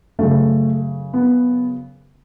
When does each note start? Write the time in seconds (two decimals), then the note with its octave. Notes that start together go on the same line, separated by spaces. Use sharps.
0.19 F#2 C#3 A3
1.14 B3